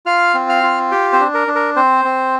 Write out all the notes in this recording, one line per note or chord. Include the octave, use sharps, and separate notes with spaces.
F4 F5 F6
C4
F5 F6
F4
G4 G5
C4 C5
D4
A#4
D4
A#4
C4 C5
C4